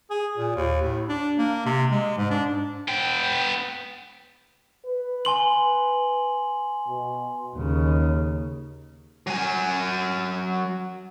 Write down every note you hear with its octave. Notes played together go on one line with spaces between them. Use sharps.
G#4
A#2
D#2
A2
D4
A#3
C3
G#3
G#2
D4
B3 G5
B4
G#5 C6 F#7
B2
D#2 C#3
F#3 G#5